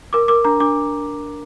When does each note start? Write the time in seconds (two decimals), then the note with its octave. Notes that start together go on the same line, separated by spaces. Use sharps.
0.13 A#4 D6
0.28 A#4 D6
0.45 D4 A#5
0.60 D4 D6